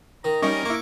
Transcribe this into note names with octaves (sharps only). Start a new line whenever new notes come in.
D#3 A#5
G3 C#4 D#4 A#4 D#5 C#6
A#3 E4 C#6 D6